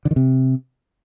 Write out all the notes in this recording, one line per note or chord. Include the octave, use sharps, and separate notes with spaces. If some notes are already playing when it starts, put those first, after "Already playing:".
D3
D#3
C3